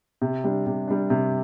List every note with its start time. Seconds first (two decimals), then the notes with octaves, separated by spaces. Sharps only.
0.22 C3
0.44 G3 D4
0.66 C3
0.88 G3 D4
1.10 C3